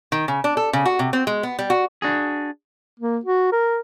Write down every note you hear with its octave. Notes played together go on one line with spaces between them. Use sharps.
D#3
C#3
D4
A4
C#3
F#4
C3
C4
G#3
B3
G3
F#4
D4 F#4 G#4
A#3
F#4
A#4